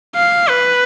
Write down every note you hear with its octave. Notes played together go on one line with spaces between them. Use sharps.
F5
B4